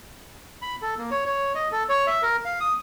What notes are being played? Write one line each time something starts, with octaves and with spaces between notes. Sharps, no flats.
B5
A4
A#3
C#5
C#5
D#5
A4
C#5
E5
A#4
F5
D#6